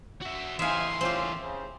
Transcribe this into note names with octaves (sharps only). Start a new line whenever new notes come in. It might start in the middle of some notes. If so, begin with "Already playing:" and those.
F#4 E5
E2 A2 C3 D#4 E5 F5 G#5 C6
C4 C#4 F4 G4
C#3 C5